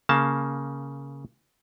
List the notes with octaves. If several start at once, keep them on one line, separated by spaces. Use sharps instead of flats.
C#3 A#3 A5